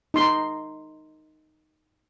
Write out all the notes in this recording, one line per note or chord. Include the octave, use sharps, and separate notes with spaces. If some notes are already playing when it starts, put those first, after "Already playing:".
D#4 C6